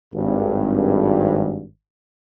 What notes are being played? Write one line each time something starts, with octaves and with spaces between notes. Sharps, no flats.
G#1 G2